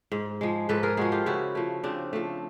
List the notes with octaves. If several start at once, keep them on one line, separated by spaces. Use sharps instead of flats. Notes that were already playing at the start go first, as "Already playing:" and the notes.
G#2
F3 G#3
G#2 A4 B4
G#4 A#4
F3 G#3 F#4 G#4
F4 G4
C#3 E4 F#4
F3 A3
C#3 C4 D4
F3 A3